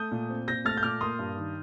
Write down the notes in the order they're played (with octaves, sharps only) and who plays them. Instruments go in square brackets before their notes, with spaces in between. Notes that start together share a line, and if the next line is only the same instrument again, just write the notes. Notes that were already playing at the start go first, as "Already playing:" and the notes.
Already playing: [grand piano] A3 D#6 G6
A#2
C4
A#2 G6 A#6
A3 F6 A6
G6
A#2 D6 F6
A#3 C6 D#6
G2
D#3